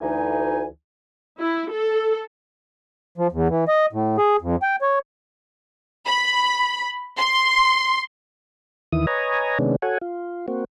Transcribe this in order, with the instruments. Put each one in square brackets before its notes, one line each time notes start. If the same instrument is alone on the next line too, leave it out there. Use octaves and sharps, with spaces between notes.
[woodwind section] D2 E3 D#4 G#5
[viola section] E4
A4
[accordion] F3
E2
E3
D#5
A2
G#4
F2
G5
C#5
[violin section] B5
C6
[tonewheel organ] D#2 D#3 E3 E4 D#6
B4 C#5 D#5 G#5 A#5
C3 D#3 G#3 B3 C#4 D4
F#4 A4 C#5 F#5 G#5
F4
A#3 C4 F#4